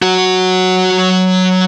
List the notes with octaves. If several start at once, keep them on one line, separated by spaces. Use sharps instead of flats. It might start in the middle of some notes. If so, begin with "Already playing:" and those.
F#3 F#4